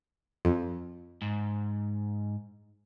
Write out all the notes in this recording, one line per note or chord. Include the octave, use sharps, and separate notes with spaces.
F2
G#2